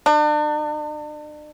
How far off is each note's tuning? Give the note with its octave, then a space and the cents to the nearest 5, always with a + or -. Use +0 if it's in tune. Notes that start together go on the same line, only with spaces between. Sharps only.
D4 +40